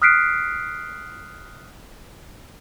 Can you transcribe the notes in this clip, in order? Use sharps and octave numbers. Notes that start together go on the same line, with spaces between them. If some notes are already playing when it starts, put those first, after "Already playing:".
D#6 F6 F#6 B6 C7 D7